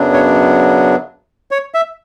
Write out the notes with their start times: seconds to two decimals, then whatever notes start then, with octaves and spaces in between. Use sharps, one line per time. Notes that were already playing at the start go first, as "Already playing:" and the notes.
Already playing: F#2 C#3 F#3 B3 D4
0.13 C#5
1.51 C#5
1.74 E5